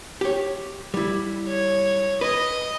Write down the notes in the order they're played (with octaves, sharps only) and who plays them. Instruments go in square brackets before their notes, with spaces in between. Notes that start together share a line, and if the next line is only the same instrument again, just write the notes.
[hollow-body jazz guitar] G4 C#5
G3 E4
[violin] C#5
[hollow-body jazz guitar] B4 [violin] D#5